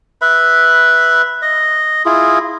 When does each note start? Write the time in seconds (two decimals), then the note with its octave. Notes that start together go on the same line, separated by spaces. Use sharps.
0.21 B4 E5 B5
1.42 D#5
2.05 E4 F4 G#4